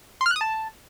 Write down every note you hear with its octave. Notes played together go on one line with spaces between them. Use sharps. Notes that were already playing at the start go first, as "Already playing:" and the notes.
C6
F6
F#6
D#6
A5